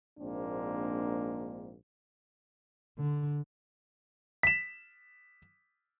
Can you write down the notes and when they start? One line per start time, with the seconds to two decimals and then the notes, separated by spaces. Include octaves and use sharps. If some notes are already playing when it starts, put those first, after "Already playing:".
0.18 A#1 G#2 A#3 C4 D4
2.98 D3
4.43 B6 E7